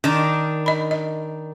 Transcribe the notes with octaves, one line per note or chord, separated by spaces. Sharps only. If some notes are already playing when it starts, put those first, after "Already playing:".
D#3 D4
D#5 B5
D#5